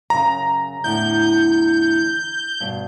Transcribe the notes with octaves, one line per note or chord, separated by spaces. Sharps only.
F#2 C#3 A#5
E2 A2 D3 G6
G2 B2